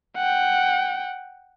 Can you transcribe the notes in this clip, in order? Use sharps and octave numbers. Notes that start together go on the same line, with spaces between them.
F#5 G5